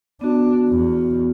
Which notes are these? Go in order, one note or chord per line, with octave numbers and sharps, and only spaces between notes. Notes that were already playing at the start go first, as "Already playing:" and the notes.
B3 D4 F#4
E2